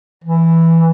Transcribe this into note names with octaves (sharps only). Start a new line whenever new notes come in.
E3